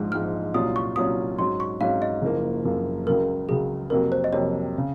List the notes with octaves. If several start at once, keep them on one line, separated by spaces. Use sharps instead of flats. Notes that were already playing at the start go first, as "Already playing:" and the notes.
Already playing: A#1 G#2 F3 G#3
A#1 G#2 F3 G#3 F6
C2 A#2 F#3 C#4 F4 D#6
C#6
C2 A#2 F#3 C#4 F4 D#6
G#2 F#3 C#4 C6
C#6
G#2 F#3 C#4 F5
D#5
F#1 F#2 F3 A#3
F#1 F#2 F3 A#3
C#2 C#3 F#3 A#4
C#2 C#3 F#3 G#4
F2 C3 F#3 A#3 A#4
C5
D#5
F2 C3 F#3 A#3 C#5
C#3